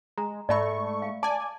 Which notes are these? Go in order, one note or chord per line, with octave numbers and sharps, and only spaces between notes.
G#3 A#5
G#2 A3 D5 E5 B5 C#6
F5
D5 G#5 A5